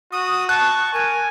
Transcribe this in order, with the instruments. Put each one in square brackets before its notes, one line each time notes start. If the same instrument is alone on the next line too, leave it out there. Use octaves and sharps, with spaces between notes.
[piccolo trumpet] F#4 [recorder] D#6
[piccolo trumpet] A5 [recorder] C#6 [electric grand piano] F#6
[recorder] A#4 [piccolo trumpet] G#5